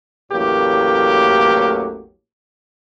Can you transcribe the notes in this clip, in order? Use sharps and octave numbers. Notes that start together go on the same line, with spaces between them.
A1 E2 A2 F#3 A#3 G4